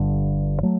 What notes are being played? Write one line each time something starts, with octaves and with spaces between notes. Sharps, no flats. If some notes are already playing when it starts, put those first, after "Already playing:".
Already playing: G1 G2 D3
F#3 A3